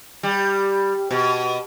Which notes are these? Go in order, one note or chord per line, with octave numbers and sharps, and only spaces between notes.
G3
B2